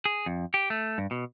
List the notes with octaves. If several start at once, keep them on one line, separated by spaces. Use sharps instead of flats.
G#4
F2
G4
A3
G2
B2